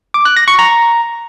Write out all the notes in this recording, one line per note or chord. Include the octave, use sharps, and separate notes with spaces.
D6
F#6
A#6
C#6
A#5